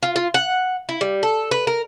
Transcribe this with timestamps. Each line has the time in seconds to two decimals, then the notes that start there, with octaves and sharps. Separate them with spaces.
0.03 F4
0.16 F4
0.34 F#5
0.89 E4
1.01 G3
1.23 A4
1.51 B4
1.67 A#4